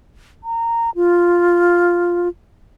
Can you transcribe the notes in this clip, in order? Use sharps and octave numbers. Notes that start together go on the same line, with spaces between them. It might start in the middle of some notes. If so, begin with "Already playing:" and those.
A#5
F4